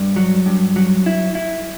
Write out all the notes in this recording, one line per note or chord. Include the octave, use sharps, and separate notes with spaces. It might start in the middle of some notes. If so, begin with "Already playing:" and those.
Already playing: G2
F#3
G2
F#3
E4
E4